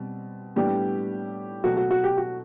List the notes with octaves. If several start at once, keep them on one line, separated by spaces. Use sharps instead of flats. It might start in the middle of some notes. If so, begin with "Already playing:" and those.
Already playing: B2 G3 C4
A2 G3 B3 D4 G4
B2 F#3 A3 F#4
F#4
F#4
G4
F#4